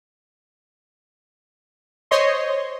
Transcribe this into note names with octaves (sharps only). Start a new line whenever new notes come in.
C5 C#5 D#5 C6